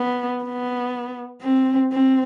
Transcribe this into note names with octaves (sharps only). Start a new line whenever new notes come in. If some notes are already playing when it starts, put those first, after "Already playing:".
Already playing: B3
B3
C4
C4